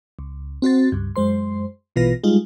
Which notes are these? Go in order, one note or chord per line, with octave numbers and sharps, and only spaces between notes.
C#2
C4 F#4 C5 A6
C#2 G2
F#2 G#3 C5 C6
A#1 B2 E3 F4 B4 A#6
G3 G#3 D#4 F4